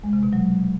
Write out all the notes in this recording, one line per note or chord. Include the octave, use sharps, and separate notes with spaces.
G#3
C3
B2
F#3